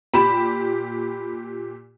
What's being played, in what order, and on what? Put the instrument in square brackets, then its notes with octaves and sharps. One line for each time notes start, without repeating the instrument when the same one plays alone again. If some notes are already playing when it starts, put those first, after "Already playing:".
[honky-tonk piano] A#2 G4 E7 [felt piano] B5